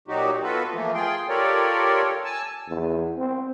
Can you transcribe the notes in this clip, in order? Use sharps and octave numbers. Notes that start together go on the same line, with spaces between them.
A#2 F#3 D#4 F#4 G4
B3 F4 F#4 A4 B4
E3 F3 A3 A#3
F4 G#4 G5 C6
F4 G4 A4 A#4 C#5 D5
G#5 A5 E6
E2
C4